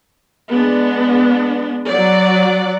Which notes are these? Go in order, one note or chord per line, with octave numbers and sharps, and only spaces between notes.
G#3 B3 D4
F#3 D5 F#5